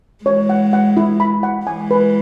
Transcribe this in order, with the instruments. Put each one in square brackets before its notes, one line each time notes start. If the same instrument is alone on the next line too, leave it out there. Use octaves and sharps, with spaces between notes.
[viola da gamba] E3 G#3 [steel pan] C#5
[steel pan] F#5
F#5
E4
B5
F#5
[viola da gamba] E3 G#3 [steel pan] G#5
[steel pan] B4